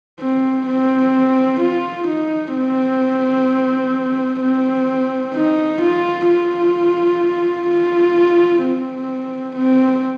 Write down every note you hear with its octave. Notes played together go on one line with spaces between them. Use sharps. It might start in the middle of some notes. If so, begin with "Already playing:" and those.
C4
C4
F4
D#4
C4
C4
D#4
F4
F4
F4
C4
C4